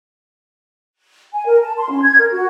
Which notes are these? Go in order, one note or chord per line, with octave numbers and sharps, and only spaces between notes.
G#5
A#4
A5
C6
C#4
G#6
A#4
F#4